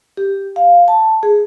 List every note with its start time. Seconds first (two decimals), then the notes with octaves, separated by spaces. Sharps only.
0.17 G4
0.56 F5
0.88 A5
1.23 G#4